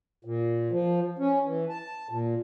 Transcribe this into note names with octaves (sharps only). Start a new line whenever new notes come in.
A#2
F3
C#4
E3
A5
A#2